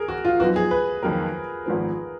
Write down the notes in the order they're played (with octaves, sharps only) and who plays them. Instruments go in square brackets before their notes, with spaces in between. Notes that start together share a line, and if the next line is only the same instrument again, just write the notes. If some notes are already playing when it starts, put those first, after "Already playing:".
Already playing: [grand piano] G#4 A#4
F#4
F4
[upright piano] F#2 F3 B3 D#4 [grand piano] F#4
[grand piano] G#4
B4
[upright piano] F2 D#3 F#3 A#3 [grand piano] A#4
[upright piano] G#1 G#2 F3 B3